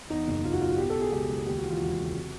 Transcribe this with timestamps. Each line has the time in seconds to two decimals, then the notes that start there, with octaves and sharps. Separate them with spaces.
0.10 E2 D#4
0.28 F#1
0.44 F#1 F4
0.53 F#4
0.61 B2 F4
0.70 F#4
0.78 B2 G4
0.90 A4
0.96 B2
1.02 G#4
1.12 C#2 G4
1.29 C#2
1.46 D#2 G4
1.58 E3 F#4
1.70 F4
1.80 E1 F#4
1.97 C#3
2.14 C3